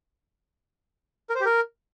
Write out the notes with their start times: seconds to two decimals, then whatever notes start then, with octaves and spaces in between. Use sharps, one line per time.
1.30 A#4
1.35 C5
1.40 G4
1.46 A#4